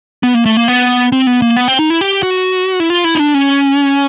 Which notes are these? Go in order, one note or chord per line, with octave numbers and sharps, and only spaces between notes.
B3
A#3
A3
A#3
B3
C4
B3
A#3
B3
C4
D#4
E4
G4
F#4
E4
F4
E4
D#4
D4
C#4